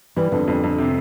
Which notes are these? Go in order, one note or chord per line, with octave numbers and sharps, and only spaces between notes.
E3 G3
F2 D3
F2
F2
C3